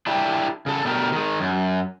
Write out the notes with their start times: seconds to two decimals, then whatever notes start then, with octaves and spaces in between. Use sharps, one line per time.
0.07 D4 E4 G4
0.66 C#3 A4
0.85 B2 D3 A3 G4 A#4
1.12 D#3 G#3
1.40 F#2